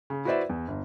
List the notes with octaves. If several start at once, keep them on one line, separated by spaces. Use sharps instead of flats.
C#3
E4 F#4 B4 C5 D5 E5
E2
G1